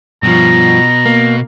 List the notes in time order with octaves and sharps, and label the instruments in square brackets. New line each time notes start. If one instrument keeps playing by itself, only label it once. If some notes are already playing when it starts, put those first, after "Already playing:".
[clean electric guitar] G2 F3 [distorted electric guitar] B2 [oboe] A#5
[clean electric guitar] A#3